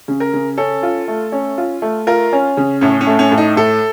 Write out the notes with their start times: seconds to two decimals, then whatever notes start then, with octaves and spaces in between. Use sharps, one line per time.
0.08 C#3
0.20 A#4
0.33 C#3
0.58 C#4 A4
0.83 F4
1.08 A3
1.32 C#4
1.58 F4
1.82 A3
2.07 F4 A#4
2.33 C#4
2.57 C#3
2.81 A2 C#4
3.01 C#4
3.07 A3
3.19 C#4
3.32 A2
3.38 D#4
3.56 A2 A4